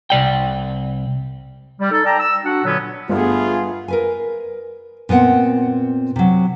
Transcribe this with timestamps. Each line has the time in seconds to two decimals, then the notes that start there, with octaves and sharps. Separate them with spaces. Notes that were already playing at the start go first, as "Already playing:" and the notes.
0.10 C2 D5 G5
1.79 G3
1.90 D#4 A4
2.05 D5 G5 A5 A#5
2.19 E6
2.43 D4 F#4 F#5
2.64 A#2 D3 F#3 B3 C#4
3.10 G1 G2 G3 A3 B3 F4 G#4
3.88 A#4 B4 G#5
5.09 A#2 B3 C4 F#5
6.16 C3 F#3